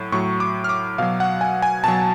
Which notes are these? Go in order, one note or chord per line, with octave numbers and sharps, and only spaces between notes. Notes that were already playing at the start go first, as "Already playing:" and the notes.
Already playing: A2 F#3
A2 F#3 C#6
D6
F6
D6
B2 F#3 F5
F#5
G#5
G#5
B2 F#3 A5